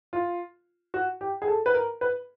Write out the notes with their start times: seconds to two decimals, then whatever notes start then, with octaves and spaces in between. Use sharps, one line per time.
0.13 F4
0.94 F#4
1.21 G4
1.42 G#4
1.48 A4
1.66 B4
1.74 A#4
2.01 B4